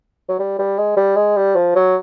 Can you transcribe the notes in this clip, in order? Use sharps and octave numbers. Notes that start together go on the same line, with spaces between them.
F#3
G3
G3
G#3
G3
G#3
G3
F3
F#3